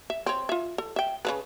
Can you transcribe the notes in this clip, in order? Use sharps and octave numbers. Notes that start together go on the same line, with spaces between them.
E5
C4 C#5
F4 E5
A4
E5 G5
C#3 A3 B4